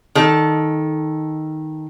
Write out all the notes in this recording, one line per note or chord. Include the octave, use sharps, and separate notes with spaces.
D#3 A4